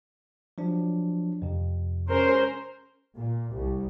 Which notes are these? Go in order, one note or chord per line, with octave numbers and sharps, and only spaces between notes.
F3 F#3 D4
F2 C3
C#4 A#4 C5
A#2
C2